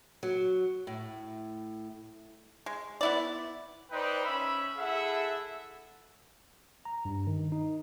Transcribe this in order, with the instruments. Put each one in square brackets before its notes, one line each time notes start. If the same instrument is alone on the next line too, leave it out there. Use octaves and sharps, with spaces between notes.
[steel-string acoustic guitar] F#3
A2
[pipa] G#3
B3 E4 D5
[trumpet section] D#4 B4 C5 D5 G5
C#4 E5 B5
E4 G#4 A4 E5 F#5
[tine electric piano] A#5
G2
D#3
D#4